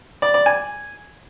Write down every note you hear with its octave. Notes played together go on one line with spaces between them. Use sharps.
D5
D5
G#5